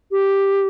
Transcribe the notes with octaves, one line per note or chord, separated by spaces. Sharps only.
G4